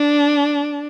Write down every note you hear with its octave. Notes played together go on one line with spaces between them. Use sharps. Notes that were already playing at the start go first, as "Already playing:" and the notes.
Already playing: D4